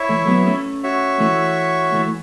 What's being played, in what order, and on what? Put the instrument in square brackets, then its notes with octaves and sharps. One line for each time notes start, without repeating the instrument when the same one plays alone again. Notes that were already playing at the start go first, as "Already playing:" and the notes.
Already playing: [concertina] E4 C#5 E5
[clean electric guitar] E3 A3
F#3 B3
A3 C#4
[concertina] F#4 C#5 E5
[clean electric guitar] E3 A3
E3 A3